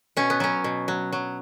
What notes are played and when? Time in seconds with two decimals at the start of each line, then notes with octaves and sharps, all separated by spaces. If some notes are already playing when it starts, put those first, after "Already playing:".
0.17 B2 C#4
0.30 B3
0.40 F#3 C#4
0.64 B2
0.88 F#3
1.12 F#3